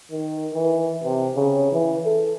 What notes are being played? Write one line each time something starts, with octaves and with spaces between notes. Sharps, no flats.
D#3
E3
C3
C#3
E3
A4